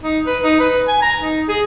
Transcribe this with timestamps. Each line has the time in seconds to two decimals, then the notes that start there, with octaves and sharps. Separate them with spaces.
0.03 D#4
0.27 B4
0.43 D#4
0.60 B4
0.88 G#5
1.02 A#5
1.20 D#4
1.49 G#4